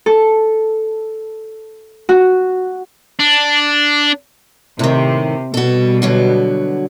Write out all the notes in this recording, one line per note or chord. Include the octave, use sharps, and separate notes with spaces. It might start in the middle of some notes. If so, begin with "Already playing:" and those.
A4
F#4
D4
A2 C3 D#3
B2 G3 F#4 A4
D3 F#3 F#4